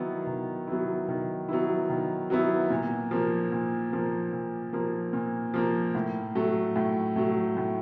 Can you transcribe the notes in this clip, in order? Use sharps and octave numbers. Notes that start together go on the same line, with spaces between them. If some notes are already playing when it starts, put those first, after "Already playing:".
Already playing: D#3 F#3 B3 E4
D#3
F#3 B3 E4
D#3
F#3 B3 E4
D#3
F#3 B3 E4
A#2
F3 A#3
A#2
F3 A#3
A#2
F3 A#3
A#2
F3 A#3
A2
F#3 A3
A2
F#3 A3
A2